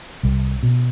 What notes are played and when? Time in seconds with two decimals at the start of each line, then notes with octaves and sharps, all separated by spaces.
0.23 C2
0.63 B2